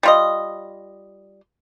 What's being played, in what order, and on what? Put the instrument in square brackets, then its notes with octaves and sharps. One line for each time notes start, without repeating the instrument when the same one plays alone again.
[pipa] G3 F4 D#5